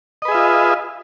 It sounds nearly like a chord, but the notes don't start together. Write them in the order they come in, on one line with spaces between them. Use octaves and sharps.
D#5 B4 G#4 E5 F4